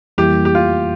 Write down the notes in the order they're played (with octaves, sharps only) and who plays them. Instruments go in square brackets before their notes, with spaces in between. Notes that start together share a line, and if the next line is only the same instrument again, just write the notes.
[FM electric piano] F2 E3 G3 A#3 E4 [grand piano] G4
[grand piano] G4
F4